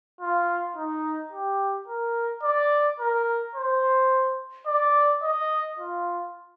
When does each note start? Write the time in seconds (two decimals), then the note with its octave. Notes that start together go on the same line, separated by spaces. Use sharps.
0.21 F4
0.76 D#4
1.32 G4
1.88 A#4
2.43 D5
2.99 A#4
3.55 C5
4.66 D5
5.22 D#5
5.79 F4